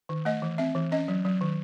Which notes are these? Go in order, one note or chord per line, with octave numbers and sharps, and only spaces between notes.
D#3
A3 D#5
E3
C4 E5
E3
C#4 D#5
F#3
F#3
D#3